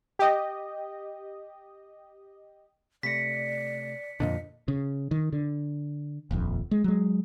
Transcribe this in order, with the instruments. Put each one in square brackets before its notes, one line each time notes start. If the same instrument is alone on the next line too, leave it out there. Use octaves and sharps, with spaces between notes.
[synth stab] G4 D#5
[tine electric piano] C3 A3 A#6 [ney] D5 [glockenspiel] B6 C#7
[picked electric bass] F2 A#2 D3 [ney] D#5
[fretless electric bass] C#3
D#3
D3
D#1 A#1 F2
G#3
F#3 G#3